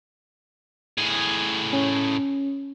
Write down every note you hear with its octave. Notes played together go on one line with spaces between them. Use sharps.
A2 G#4
C#4